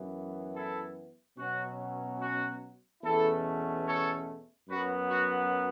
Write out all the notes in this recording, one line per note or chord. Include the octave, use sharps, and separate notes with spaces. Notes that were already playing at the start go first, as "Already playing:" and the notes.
Already playing: F#2 E3 B3
E4 A4
B2 F#3 C#4 F#4
F#4
E2 B2 A3 C#4 E4 A4
A4 C#5
F#2 F#3 B3 F#4 B4
F#4